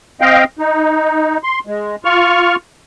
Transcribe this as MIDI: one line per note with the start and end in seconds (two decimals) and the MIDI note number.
0.21 0.44 60
0.21 0.44 75
0.21 0.44 77
0.21 0.44 79
0.59 1.37 63
1.43 1.59 84
1.67 1.96 56
2.05 2.56 65
2.05 2.56 85
2.05 2.56 89